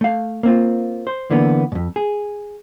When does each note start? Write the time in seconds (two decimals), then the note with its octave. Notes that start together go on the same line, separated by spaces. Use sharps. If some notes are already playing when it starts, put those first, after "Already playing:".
0.01 A3 F5
0.43 A#3 C4 F4
1.07 C5
1.30 D3 E3 A#3 B3
1.72 F2 G#2
1.96 G#4